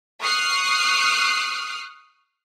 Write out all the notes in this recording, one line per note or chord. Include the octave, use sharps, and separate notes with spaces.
C#6 D#6 F6 F#6 C7